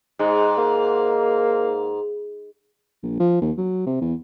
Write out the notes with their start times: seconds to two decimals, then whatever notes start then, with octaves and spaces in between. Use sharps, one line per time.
0.19 G#2 G#3
0.58 A#3
3.03 A#1
3.20 F3
3.42 D#2
3.58 F#3
3.87 C3
4.01 E2